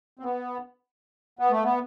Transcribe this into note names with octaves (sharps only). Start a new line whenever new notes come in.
C4
B3
B3
A3
B3